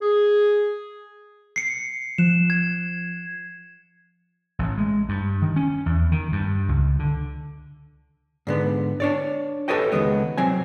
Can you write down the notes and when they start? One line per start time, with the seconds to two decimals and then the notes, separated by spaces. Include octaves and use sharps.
0.02 G#4
1.56 C7 C#7
2.18 F3 F#6 E7
2.50 G#6
4.59 A1
4.78 G#3
5.09 G2
5.42 D#3
5.56 C#4
5.86 E2
6.12 D#3
6.32 G2
6.69 C#2
6.99 D3
8.47 G#2 D3 B3
9.00 D4 C#5 D5
9.68 G4 A4 B4 C#5 D#5 G5
9.92 C#2 G#2 D#3 G#3 B3
10.37 C3 F#3 C4 G#5